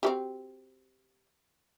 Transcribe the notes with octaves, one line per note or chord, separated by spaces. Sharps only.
C4 F#4 G4